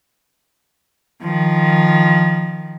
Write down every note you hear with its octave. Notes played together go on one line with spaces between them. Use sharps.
D#3 F3